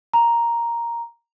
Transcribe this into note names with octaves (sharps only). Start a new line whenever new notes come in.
A#5